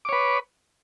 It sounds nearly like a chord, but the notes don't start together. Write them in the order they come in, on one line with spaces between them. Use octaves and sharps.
D6 C#5 B4